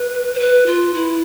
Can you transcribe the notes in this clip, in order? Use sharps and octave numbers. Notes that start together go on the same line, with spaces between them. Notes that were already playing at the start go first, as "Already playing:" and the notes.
Already playing: B4
C5
B4
F4
E4